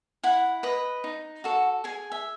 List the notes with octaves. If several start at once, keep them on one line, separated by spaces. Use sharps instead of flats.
E4 F#5
B4 D#5
D#4
F#4 A4
G#4 G#5
E5